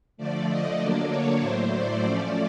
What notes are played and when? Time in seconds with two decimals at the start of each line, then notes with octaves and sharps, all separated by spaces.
0.17 D3 F3 A3 D5
0.48 D#5
0.79 D3 F#3 A#3 D4 D5
1.09 C#5
1.40 A2 F#3 A3 C5
1.71 D5
2.02 F3 A3 C#4 D5